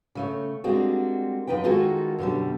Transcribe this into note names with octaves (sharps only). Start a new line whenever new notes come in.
C#3 A3 C#5
G3 G#3 A#3 C4 D4 F#4
F#2 F3 D#4 B4 G5
D#3 G#3 A#3 F4 F#4 A4
F#2 B2 D3 G3